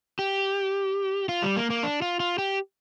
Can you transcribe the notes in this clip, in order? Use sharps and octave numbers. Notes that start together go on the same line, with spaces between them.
G4
F4
G3
A#3
A#3
D4
F4
F4
G4